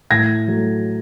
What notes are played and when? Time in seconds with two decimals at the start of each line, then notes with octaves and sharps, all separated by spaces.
0.11 A2 G#6 A#6
0.48 F#3 A3